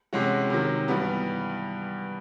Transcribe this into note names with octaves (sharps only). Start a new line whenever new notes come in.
C3 E3 G#3 C#4 F#4
C3 D#3 F#3
G2 E3 G3 B3